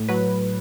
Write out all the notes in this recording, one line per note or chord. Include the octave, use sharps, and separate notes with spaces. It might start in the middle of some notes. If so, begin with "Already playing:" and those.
Already playing: A2
F#3 B4